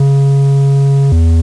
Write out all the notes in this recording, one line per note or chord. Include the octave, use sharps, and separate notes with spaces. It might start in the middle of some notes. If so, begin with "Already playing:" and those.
Already playing: C#3
E2